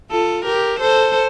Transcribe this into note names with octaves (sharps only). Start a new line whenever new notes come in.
F4 A4
G4 A#4
A4 C5